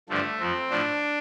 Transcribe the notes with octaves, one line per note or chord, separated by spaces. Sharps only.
G2 D3 F3 A3
F2 F3 C4
A2 F3 D4